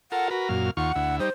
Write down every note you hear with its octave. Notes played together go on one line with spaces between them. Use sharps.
F4 A4 A#4 F#5
F#4 A#4 B4
F#2 A#2 F5
D#2 F4 F#5 C#6
D2 E4
G3 D#4 C5